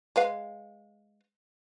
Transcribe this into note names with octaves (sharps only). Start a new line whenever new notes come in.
G#3 B4 F5